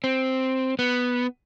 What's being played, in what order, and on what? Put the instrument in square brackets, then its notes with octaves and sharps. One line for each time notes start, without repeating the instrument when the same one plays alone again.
[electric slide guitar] C4
B3